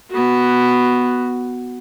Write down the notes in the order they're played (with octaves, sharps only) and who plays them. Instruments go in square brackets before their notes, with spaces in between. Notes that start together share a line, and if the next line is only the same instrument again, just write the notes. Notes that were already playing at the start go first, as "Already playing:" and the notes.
[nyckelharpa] B3 F#4